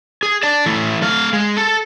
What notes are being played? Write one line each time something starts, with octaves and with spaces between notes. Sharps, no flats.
G#4
D5 A5
E3 A3
A3 F5
G#3
A4